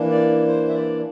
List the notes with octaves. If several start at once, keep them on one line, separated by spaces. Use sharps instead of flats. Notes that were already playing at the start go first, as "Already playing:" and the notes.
Already playing: E3 A#3 D4
D5
C5
E5
D5